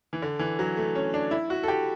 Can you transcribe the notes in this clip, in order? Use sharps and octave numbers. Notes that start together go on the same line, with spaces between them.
E3
D3
E3
F#3
A3
C#4
D4
E4
F#4
A4
G4